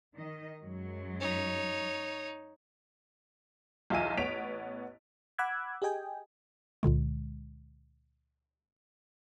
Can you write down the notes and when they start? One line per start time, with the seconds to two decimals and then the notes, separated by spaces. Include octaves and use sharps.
0.15 D#3 D#5
0.61 F#2 F#3 G#3
1.20 D#4 C#5
3.90 B1 E2 F4 E5 G#5 D#7
4.17 A1 B3 C#5 B6 D7 F7
5.38 F#5 B5 D6 E6 F#6 G#6
5.82 G4 G#4 D#5 G5 G#5
6.83 C#2 A#2 D3 G#3